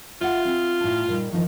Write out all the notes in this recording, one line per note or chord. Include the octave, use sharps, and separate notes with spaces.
F4 E5 F#5
C4
A2 A5
A#2 G3 D#4
D#3 F3 D#4